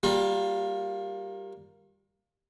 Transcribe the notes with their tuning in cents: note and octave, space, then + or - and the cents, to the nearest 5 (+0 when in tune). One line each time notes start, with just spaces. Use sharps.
G3 +0 A#3 +0 F4 +40